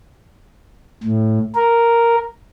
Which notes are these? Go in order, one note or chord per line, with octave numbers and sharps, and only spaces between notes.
A2
A#4